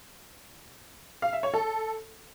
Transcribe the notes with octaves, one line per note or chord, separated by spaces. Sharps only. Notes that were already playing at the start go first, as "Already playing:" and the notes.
F5
E5
C#5
A4